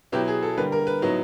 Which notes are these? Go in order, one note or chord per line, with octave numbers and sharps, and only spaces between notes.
B2 F#3 B3 E4 G4
G#4
A4
D3 G3 A#3 B4
A#4
B4
A2 F#3 B3 D#4